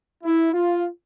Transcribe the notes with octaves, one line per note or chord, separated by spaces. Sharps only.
E4
F4